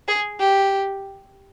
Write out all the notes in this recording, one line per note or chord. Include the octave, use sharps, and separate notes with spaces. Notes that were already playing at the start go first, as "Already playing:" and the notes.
G#4
G4